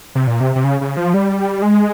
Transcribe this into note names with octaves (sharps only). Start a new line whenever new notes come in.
C3
A#2
C3
C3
C#3
C#3
F3
G3
G#3